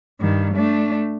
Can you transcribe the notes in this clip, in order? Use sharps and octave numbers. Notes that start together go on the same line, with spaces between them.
G2 D#3
A3 D4